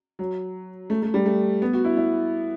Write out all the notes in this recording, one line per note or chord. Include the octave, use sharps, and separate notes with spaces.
F#3
A3
A3
G3
A3
B3
F#4
E4
E4